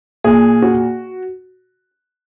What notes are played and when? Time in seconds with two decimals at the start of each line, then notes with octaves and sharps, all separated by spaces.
0.24 A#2 G#4
0.62 F#4